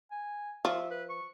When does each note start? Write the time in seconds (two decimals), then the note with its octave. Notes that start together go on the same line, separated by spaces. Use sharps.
0.11 G#5
0.65 F3 E5
0.91 B4
1.10 C#6